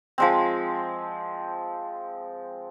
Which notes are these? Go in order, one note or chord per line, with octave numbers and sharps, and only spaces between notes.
F3 G#3 C4